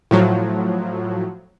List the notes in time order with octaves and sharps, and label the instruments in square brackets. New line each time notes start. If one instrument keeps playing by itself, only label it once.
[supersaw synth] A2 F3 F#3